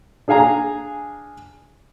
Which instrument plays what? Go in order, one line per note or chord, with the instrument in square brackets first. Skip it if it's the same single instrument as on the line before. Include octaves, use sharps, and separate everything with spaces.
[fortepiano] D4 G#4 F5 G#5 A#5